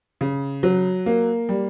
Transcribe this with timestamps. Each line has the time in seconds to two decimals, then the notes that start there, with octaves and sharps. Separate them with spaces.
0.21 C#3
0.63 F#3
1.06 A#3
1.49 G3